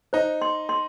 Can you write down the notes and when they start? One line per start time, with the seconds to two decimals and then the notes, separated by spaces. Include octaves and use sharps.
0.13 D#4 C5
0.42 C6
0.69 C6